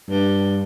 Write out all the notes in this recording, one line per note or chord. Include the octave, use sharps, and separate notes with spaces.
G2